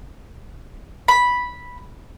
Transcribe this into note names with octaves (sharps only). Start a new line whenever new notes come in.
B5